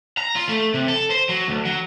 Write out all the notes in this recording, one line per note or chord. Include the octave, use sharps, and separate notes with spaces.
A#5
F4
A3
C3
A4
C5
F#3
D2
F#3